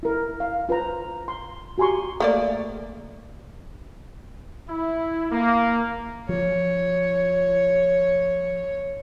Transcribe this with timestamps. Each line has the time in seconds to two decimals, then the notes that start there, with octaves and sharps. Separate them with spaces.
0.03 E4 A#4
0.40 F5
0.69 F4 B4 C5 A#5
1.28 C6
1.78 F#4 G4 G#5 A#5 C6 C#6
2.20 A3 A#3 D5
4.69 E4
5.32 A#3
6.29 F3 C#5